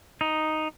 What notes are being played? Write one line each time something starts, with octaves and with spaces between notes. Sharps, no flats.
D#4